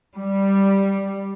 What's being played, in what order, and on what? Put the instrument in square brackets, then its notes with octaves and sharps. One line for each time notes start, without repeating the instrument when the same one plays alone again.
[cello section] G3